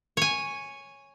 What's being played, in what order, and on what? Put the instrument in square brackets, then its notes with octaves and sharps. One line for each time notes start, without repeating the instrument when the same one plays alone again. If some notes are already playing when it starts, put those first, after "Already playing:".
[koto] C#5 G#5